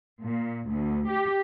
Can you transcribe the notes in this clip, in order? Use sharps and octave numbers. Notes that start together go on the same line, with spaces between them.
A#2
D2
G4